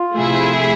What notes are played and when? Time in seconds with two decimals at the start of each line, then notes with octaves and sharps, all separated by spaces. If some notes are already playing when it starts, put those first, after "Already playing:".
Already playing: F4
0.15 C3 F3 A3 E4 G#4